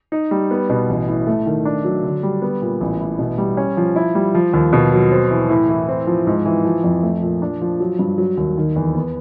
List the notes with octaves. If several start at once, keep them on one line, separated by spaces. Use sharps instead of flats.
D#4
G3
B3
B2
A1
A2
A3
D#3
D4
F#3
D3
G3
B3
A#2
A1
A2
B2
G3
C#4
F3
E4
G3
F3
D#2
B2
F#3
C4
E3
A2
E3
C4
F3
G#2
E3
F3
F2
A3
A#2
D4
F3
F#3
G2
F#3
D#2
D#3
E2
B3